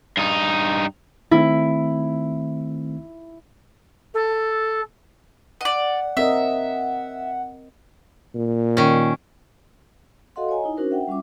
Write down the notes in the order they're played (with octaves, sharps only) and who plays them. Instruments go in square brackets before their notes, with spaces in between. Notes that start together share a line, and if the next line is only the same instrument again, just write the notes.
[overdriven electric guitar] G2 D#4
[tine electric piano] D#3 A3 C4 [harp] E4
[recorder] A4
[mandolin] D5 D#5 [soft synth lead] F#5
[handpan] C4 A#4 D#5 [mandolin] E5
[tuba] A#2
[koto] D#3 C#4
[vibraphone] F#4 A4 D#5 F5 F#5 C6
C#5 D#5 G#5 A#5
D#4 E4
C#4 D4 F#4 A#4 C5
E5 F#5 G5
G3 C#4 F4 E5 D6